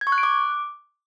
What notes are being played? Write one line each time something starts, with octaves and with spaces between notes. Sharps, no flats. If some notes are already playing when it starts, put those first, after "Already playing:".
G#6
C#6
F#6
D7
D6